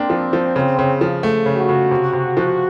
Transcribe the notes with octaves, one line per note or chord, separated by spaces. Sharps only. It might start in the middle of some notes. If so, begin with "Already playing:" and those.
Already playing: A#3 C4 D4
F3
F3
C#3
C#3
F3
A3
C#3
F#4
C#3
C3
C3
F3